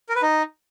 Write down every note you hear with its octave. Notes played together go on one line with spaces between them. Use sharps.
A#4
B4
D#4